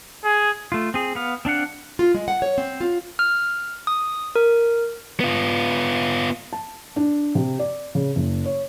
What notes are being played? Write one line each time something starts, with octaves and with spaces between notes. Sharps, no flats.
G#4
A3 F4
C4 G#4
B3 F5
C4 D4 F5 F#5
F4
G#3
F#5
C#5
C4
F4
F6
D#6
A#4
B3 F4
A5
D4
C3
D5
C#3
F#1
C#5